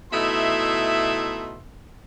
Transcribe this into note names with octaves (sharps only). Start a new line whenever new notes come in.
B2 A3 D#4 E4 E5 C6